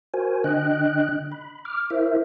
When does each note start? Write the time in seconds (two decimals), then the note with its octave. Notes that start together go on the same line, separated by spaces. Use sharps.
0.14 F#4 A#4 C5 G#5
0.44 D3 D4 D#5 G5 F#6
1.32 B5
1.65 D6 F6
1.90 E4 A#4 C5 E5